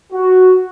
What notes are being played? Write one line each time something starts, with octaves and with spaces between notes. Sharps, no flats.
F#4